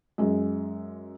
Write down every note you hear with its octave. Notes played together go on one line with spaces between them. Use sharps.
F#2 G#3